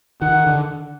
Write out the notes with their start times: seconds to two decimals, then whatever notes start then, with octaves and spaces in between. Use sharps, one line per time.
0.22 D#3 F#5
0.47 D3